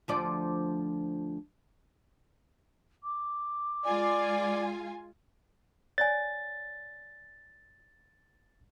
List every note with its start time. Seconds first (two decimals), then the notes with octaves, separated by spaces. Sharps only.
0.08 D2 F3 D5
3.03 D6
3.85 G#3 F4 D5 G#5
5.98 C#5 D5 G#5 A6